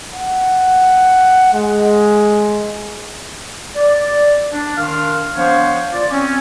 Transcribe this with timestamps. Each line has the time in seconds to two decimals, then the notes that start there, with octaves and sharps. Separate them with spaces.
0.14 F#5
1.54 G#3
3.76 D5
4.53 D4
4.77 D#3 D4 F5 C6 F6
5.37 F3 B3 D4 C5 C#5 F5
5.92 F4 D5
6.11 C4 C#4